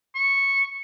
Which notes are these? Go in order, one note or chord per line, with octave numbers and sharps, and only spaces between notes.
C#6